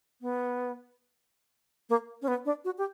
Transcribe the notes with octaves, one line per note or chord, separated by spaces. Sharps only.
B3
A#3
C#4
B3
D4
F#4
G4